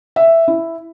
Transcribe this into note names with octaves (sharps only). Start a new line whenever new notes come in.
E5
E4